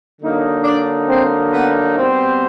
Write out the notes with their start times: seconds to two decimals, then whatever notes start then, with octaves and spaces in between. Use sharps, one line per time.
0.20 D3 F#3 A#3 D#4
0.64 D4 D5
1.08 C4 C5
1.53 B3 B4
1.97 B2 G3 B3 C4 C5